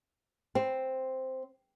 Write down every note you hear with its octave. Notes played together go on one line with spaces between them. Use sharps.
C4